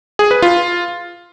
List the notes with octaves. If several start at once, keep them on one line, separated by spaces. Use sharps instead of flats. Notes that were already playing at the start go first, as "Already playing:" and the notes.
G#4
B4
F4